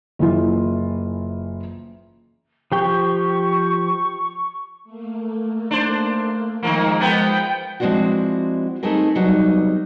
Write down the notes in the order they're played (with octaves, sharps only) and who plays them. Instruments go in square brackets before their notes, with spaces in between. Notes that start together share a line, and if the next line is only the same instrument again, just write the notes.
[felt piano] F#1 E3 F4
[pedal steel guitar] F3 G4 G5 [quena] C#6
[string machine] A3 A#3
[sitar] D4 C5
[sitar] D#3 F3 A#3 [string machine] G#3 C5 D#5
[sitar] F3 B3 [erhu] G5
[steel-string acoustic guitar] F3 G#3 C4 D4 E4 F#4
A3 C4 D#4 G#4 A#4
E2 C3 F#3 G3 D#4